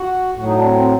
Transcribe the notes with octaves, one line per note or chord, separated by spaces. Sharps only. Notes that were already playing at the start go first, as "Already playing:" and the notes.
Already playing: F#4
A2 F#3 F#4
D#4
D4
C4
C4